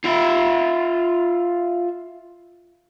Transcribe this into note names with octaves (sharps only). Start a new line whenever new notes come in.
F4 E5